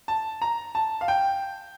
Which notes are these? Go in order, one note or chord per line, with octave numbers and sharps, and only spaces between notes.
A5
A#5
A5
F5
G5